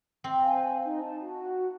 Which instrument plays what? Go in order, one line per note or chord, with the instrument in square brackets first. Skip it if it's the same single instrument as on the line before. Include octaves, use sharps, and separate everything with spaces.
[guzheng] C4
[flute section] C5 F5 G#5
D#4
A5
F#4